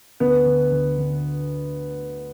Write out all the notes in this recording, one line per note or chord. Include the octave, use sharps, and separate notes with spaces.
D2 B3
D3
D2
D3